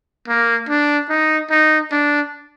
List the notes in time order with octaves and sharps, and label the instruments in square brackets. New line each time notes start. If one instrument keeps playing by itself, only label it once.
[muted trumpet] A#3
D4
D#4
D#4
D4